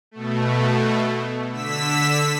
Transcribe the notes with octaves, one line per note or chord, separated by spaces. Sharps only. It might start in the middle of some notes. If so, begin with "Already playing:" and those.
B2 A3
D3 E6 B6